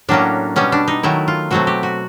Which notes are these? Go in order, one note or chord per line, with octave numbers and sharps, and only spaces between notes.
A2 F#3 A#3 C#4 D4
B2 G3 B3 C#4
D4
D#4
D#3 F#3 A3 E4
F4
B2 F#3 A3 C4 F#4
G4
F#4